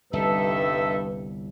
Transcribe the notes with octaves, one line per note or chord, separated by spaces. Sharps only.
G1 C2 G2 D#4 A4 B4 E5